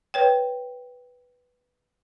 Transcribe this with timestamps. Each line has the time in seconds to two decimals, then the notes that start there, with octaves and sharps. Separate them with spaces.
0.14 B4 C#5 G5